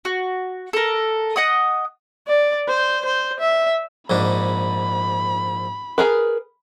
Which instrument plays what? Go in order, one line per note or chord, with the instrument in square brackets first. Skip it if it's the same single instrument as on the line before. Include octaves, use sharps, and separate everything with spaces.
[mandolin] F#4
A4 A#4
D#5 F#5 D#6
[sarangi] D5
C5
C5
E5
[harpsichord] A#1 G#2 D4 [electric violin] B5
[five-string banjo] G#4 A#4 B4